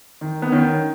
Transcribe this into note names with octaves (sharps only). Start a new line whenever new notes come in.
D#3
B3
D#3 C#4